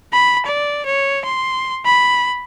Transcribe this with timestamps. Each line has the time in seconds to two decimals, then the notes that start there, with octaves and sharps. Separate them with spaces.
0.13 B5
0.46 D5
0.86 C#5
1.25 C6
1.85 B5